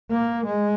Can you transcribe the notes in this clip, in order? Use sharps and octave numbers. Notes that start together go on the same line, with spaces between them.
A#3
G#3